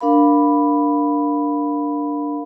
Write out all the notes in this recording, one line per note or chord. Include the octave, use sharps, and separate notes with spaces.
D4 A#4 F5 B5